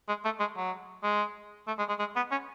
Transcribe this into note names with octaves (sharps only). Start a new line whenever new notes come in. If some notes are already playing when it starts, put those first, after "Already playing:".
G#3
A3
G#3
F#3
G#3
A3
G#3
G#3
G#3
B3
C#4